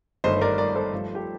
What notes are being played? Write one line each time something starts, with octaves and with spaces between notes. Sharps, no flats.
G1 G2 D#3 A3 C5 D#5
C5
A#4 D5
A#4 D5
A4 C5
G2 F3 A3
G4